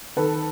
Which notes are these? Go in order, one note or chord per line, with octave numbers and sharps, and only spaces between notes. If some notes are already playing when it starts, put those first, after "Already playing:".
D#3 A4 B4